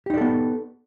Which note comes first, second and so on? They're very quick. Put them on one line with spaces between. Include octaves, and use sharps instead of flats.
G4 D#4 D5 A4 B3